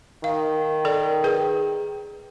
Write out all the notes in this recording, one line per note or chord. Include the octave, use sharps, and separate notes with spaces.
D#3 F5
A4 A#4 D5
G#4 B4 G5